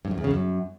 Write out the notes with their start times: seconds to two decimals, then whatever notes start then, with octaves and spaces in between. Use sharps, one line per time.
0.05 G2
0.11 F#2
0.18 E2
0.24 C#3
0.31 F#2